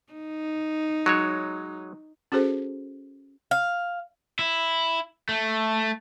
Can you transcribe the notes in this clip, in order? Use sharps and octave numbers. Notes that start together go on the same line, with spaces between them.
D#4
F#3 G#3 C#5
C#4 F#4 G#4 A4 C5
F5
E4
A3